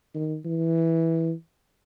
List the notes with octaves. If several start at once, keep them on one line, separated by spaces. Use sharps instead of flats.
D#3
E3